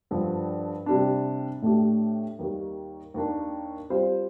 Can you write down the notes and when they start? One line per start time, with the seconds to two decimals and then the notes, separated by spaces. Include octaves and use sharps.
0.11 G2 D3 F3
0.86 C3 G3 D4
1.62 A2 A3 D4 G4
2.39 D#2 D#3 G3 A#3
3.14 D#2 D#3 A#3 D4
3.90 G3 C4 F4 C5